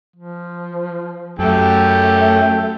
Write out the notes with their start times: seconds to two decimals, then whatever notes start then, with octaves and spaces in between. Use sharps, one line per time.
0.16 F3
1.39 F#2 A3 G4 A4 G5